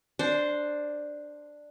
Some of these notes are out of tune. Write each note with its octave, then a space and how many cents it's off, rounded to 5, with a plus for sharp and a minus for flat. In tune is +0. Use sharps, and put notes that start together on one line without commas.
D4 +5 C5 +0